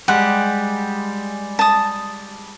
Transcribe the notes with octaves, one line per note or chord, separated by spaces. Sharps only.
G3 G#3 G4 F#5
A5 D#6